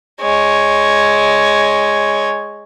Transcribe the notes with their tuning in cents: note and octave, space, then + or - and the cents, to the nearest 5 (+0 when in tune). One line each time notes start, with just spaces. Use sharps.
G#3 +0 C#5 +0